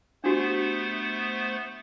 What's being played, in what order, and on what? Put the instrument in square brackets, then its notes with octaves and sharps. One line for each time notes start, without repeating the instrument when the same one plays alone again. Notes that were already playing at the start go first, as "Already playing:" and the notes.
[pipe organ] A3 B3 C5 [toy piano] D4 F#4 G4